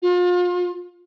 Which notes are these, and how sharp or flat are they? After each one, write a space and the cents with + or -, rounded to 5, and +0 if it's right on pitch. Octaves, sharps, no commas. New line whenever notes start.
F4 +35